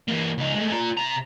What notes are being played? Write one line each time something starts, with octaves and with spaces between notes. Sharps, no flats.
E3 A#3
C#2 D#4
G#3 A3
F4 A#5
C3 A#5